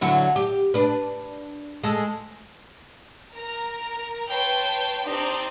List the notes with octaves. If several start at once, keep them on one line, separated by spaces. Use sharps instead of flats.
D3 F#3 E4
G4
D4 B4
G#3 A4
A#4 A#5
B4 C#5 G5 A5 C6
C4 D4 D#4 G4 C5 D5